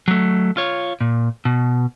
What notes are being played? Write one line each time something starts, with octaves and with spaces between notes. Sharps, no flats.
F#3 A3
F4 C#5
A#2
B2